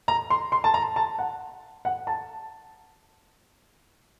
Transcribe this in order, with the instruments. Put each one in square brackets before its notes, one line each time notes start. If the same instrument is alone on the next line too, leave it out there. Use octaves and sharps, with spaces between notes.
[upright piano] A#5
C6
C6
A5
A#5
A5
F#5
F#5
A5